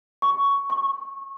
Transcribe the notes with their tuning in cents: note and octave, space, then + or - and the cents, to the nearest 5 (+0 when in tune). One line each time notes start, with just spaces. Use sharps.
C#6 +10
C#6 -20